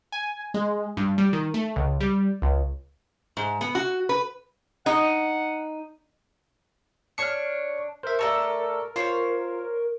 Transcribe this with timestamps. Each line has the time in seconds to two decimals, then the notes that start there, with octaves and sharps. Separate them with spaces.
0.12 G#5
0.54 G#3
0.97 G2
1.18 G3
1.33 D#3
1.54 A3
1.76 C#2
2.00 G3
2.42 C#2
3.37 G#2
3.61 B3
3.75 F#4
4.09 B4
4.86 D#4 F#5
7.18 D4 C#5 C#6 F6 C#7
8.03 A#4 C5 E5
8.19 A3 A4 D5 A5 A#5 C#6
8.96 F4 C5 C#5